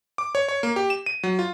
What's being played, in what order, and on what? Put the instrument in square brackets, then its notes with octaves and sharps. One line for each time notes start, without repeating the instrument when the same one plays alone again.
[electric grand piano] D6
C#5
C#5
A#3
G4
E7
D#7
F#3
F4